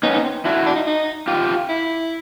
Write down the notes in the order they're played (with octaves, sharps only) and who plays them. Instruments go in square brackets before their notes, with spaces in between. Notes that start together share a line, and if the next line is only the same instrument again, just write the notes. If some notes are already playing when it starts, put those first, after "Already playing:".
[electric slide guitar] B3 C#4 [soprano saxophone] D#4
[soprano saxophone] D#4
C4
[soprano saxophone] D4 [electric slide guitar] E4 F#4
[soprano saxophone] D4
D#4
D#4
[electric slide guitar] F4 G4
[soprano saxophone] E4